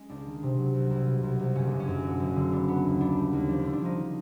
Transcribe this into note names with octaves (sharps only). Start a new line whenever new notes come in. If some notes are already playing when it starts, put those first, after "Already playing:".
Already playing: G#3 C#4
C#2 D4
D#3
C3
F#3
C2
C2
B2
C2
C2
F#1 C#4
F#1 D4
C#4
F#2
D3
F#1
D3
B3 D4
B3
D#2
B3 D4
G3
D#2
F3 D4
D3 D4
D4
F3 D#4